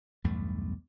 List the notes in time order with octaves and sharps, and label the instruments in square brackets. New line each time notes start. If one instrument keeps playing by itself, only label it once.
[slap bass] B1 E2 G2 A3